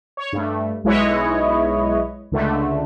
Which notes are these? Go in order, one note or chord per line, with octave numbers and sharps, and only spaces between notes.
C#5
G2 A3
B1 G#3 E4 B4 C#5 D#5
C#2 D3 A3